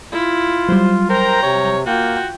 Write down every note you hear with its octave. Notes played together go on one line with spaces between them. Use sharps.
E4 F4
F#3 G3 C5
A#4 C5 G5 A#5
C3 C#5
A#3 F4 F#4 G5